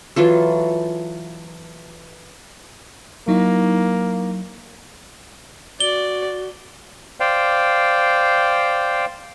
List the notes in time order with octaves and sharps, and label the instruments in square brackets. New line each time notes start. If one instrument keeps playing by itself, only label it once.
[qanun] E3 F#3 F4 A4
[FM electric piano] F#3 D#4 E4 [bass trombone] A#3
[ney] F#4 [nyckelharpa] D5 [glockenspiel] G7
[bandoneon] C5 D5 F5 G5